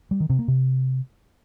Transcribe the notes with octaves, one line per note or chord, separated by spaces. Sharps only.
G3
D#3
C3
A#3
C3